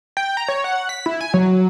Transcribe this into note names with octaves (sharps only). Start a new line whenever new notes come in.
G5
A#5
C#5
F#5
B6
E4
G#5
F#3